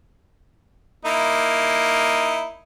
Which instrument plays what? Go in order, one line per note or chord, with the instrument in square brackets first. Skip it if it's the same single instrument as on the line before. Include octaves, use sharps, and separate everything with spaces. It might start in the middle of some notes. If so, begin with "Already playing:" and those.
[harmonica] A#3 D#4 E4